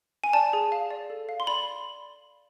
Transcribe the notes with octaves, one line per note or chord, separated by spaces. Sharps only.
G#5
D5 A5
G#4
F5
D5
A4
F5
C6
D5 B5